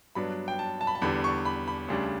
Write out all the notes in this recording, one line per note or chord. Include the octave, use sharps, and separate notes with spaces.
G2 F#3 B3 D4 B5
G5
A5
A5
B5
A5
E2 D3 G3 D4 B5
C#6
B5
B5
D2 C#3 G3 D4